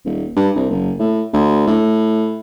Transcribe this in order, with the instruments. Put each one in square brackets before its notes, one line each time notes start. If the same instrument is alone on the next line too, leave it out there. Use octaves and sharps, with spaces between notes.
[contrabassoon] D#1
G2
C2
F#1
A2
D2
A2